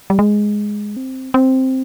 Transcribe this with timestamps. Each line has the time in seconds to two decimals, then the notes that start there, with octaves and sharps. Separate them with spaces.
0.10 G3
0.19 G#3
0.97 C4
1.34 C4